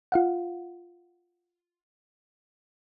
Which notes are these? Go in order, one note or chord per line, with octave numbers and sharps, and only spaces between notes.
F4 F5 F#5